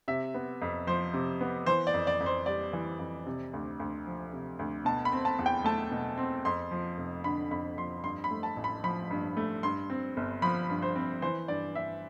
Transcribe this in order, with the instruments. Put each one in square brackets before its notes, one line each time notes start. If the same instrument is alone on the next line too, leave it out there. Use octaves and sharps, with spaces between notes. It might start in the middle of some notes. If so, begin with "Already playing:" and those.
[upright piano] C3 E5
B3
F2
F3 C5
C3
B3
E3 C5
D5
F2
D5
F2
C5
G3 D5
E3
F2
C3
D2
D2
F3
C3
D2
B2 A5
B5
C4
A5
E2
G5
A3 A5
B2
C4
F2 C6
F3
F1
D3 B5
F2 B5
F3 C6
G2 C6
B5
A3
A5
A1
B5
F3 B5
G2
A3
G2 C6
C4
G1
F3 B5
G2
C5
C4
E3 C5
G2 D5
G2 E5